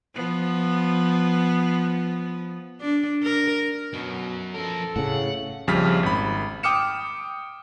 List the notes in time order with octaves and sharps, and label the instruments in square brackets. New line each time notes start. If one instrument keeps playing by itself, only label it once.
[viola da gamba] F3 B3
D4
A#4
[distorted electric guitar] F#2 F#3 [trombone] B2
[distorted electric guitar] F3 A#4 [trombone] A4
[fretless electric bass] A2 C#3 [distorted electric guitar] F#5
[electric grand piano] A#1 F2 C#3 G3 F6 B6
G#1 B5
G5 D6 D#6 F6 C#7 E7